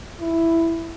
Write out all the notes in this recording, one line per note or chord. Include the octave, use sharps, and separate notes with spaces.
E4